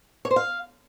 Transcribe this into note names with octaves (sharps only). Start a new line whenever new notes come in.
C#5
C5
F5